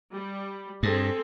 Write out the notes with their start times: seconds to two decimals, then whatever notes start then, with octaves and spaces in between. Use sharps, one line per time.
0.13 G3
0.83 G2 C4 G#4 A4